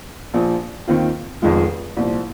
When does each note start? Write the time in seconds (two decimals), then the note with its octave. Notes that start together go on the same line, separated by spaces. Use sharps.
0.34 A#1 A#2 F3
0.88 D#2 D#3 C4 F4
1.42 F1 F2 D#3 G#3 F4
1.97 C2 A#2 F3